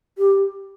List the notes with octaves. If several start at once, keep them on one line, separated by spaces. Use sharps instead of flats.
G4